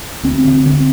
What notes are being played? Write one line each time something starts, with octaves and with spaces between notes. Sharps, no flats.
D2 C4
D3
D3 C4